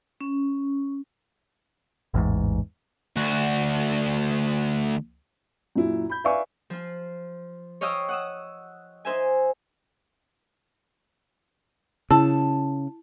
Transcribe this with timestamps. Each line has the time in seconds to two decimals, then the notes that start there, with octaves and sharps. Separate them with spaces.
0.21 C#4
2.14 A1 E2 G#2
3.16 D2 F#4
5.76 F#2 A#2 E4
6.10 B5 G6
6.24 B4 D5 E5 F5 G#5 C#6
6.70 F3 F4
7.81 C#5 D#5 F5 G5 D#6 E6
8.09 F#5 D#6 E6
9.05 D#4 C5 E5 G#5
12.11 C#3 E4 A5